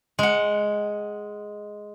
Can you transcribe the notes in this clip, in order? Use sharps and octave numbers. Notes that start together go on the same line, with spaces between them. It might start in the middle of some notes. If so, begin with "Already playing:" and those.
G#3 F#5